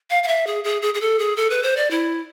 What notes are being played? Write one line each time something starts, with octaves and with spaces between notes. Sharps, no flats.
F5
F5
E5
G#4
G#4
G#4
G#4
A4
G#4
A4
B4
C5
D5
E4